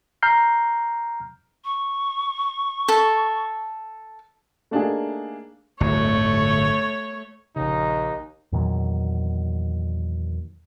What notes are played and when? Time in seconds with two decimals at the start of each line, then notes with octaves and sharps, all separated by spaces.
0.22 A#5 F6 G6 C7
1.64 C#6
2.88 A4
4.71 A3 A#3 D4 D#4 G4 G#4
5.80 D1 G1 D2 A3 C#5
7.56 A#1 D#2 C#3 D#4
8.52 E2 A#2 D#3 F#3